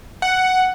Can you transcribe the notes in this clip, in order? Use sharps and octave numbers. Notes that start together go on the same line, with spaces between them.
F#5